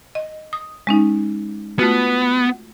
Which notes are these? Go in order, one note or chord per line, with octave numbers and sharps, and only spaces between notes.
D#5
D#6
G#3 C#4 D#4
A3 B3 F4 F#4